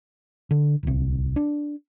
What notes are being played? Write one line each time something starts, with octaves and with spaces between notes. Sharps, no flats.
D3
D1 C2
D4